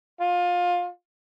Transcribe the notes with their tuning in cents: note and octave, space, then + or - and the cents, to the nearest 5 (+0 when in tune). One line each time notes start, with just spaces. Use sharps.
F4 +20